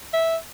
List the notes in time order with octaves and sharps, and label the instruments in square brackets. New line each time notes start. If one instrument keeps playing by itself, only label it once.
[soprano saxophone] E5